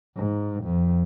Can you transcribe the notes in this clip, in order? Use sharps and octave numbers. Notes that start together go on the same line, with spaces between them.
G#2
F2